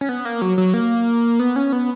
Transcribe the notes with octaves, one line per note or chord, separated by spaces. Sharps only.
C#4
B3
A#3
F#3
F#3
A#3
B3
C#4
B3